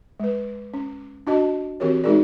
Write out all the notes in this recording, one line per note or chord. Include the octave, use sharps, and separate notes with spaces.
G#3 B4
C#4
D4 F#4 D#5 A5
E3 C4 F#4 G4 A#4 C#5
G#3 D#4 F#4 G#4 A#4 D5